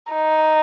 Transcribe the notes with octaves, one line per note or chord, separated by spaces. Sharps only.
D#4